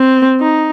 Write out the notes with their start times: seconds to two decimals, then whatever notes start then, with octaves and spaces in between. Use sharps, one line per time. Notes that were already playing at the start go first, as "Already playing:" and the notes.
Already playing: C4
0.41 D#4